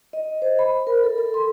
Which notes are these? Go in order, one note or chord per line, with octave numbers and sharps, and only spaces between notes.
D#5
C5
B5
A#4
A4
A4
C6